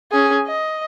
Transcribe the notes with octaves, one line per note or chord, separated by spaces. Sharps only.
C#4 G#4
D#5